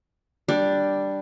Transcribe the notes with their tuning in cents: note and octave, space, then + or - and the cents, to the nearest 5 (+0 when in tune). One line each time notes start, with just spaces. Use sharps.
G3 +0 D4 +0